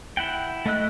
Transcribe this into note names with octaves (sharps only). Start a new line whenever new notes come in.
E4 F#5 G5
A3 E4 D#5 E6 F#6